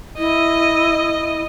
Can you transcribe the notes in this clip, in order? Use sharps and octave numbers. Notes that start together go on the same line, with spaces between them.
E4 D#5